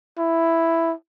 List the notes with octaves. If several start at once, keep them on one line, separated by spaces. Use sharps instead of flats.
E4